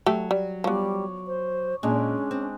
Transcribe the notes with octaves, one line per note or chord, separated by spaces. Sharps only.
F#3 A3 G4 A4
G3
F3 G3 B3 C#5 D5
C5
A#2 G#3 C#4 D4 G#5
C4